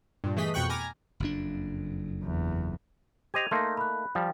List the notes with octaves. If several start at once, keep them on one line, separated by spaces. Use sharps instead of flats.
G2 A#2
E3 A3 G#4 D#5 B6
F2 B2 G5 C#6 F#6
G#5 A#5 B5 D6 F6 A#6
F#1 F2 D4
E2
G4 C5 D#5 G#6 D#7 F7
A3 A#3 D#4 C6 A#6
B5 F#6
F3 G3 G5